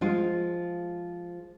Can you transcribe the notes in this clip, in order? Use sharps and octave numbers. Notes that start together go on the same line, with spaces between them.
F3 G#3 F4